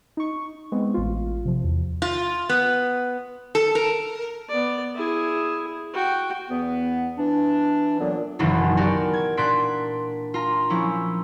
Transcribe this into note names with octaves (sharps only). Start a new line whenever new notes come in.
D#4 C#6
G#3 B3 C4
A1 F4
C3 F3
E2
F4
B3
A4
A#4
B3 D5
E4 G#4
F#4 G5
E2 B3
E3 D4
A#2 D3 E3 F#3 B3
F#1 B1 F#2 D#3 E3 F#3
F#4 G4 A#4 D5
G#6
A#2 D4 C6 F#6 B6 D7
F4 A#5
F3 C#4 E4